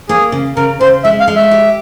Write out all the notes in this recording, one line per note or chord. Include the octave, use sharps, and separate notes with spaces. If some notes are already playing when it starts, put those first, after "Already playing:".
A#3 G#4
C#3
C#3 A#4
C#3 C5
G#3 E5
F5
G#3
E5
G4